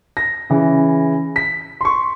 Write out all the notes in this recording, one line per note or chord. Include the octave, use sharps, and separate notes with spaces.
A#6
C#3 E3
B6
C6 C#6